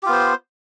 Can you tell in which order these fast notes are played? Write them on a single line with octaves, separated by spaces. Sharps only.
G4 F4 B3 C5